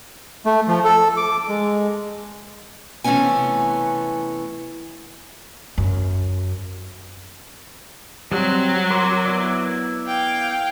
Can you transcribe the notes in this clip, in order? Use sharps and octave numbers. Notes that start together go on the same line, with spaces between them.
A3
F3
A4
D6
G#3
C3 E3 A3 B3 C#4 G#5
F#2
F#3 G3 C4
A#4 C6 D6
B3 E4 D5
F5 G5